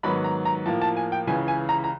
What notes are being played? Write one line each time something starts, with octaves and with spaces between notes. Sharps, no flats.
G#2 D#3 F#3 B3 B5
A#5
A#5
A2 F3 A#3 A5
A5
G#5
G5
C#2 C#3 E3 G#5
G#5
A#5
A#5